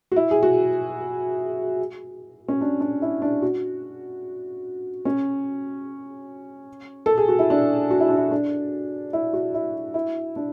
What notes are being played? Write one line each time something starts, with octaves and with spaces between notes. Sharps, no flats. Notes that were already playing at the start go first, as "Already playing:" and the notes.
F#4
E4
G#4
F#4
C#4
D4
D4
E4
D4
F#4
C#4
A4
G#4
F#4
E4
D4
F#4
E4
D4
E4
D4
E4
F#4
E4
E4
D4